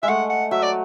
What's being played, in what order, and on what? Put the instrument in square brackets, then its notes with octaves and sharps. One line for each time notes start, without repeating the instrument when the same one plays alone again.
[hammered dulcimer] G#3 [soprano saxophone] E5
[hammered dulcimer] A3 [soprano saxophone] F#5
[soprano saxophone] F#5
[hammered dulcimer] F#3 [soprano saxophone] E5
[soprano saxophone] D5